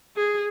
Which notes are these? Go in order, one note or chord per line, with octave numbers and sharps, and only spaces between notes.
G#4